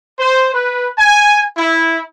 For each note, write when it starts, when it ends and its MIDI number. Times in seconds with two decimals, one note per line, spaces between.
0.18 0.51 72
0.53 0.87 71
0.98 1.42 80
1.57 2.00 64